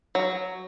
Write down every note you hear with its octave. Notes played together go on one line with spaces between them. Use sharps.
F#3